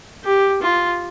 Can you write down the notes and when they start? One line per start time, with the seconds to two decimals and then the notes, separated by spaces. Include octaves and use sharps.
0.24 G4
0.62 F4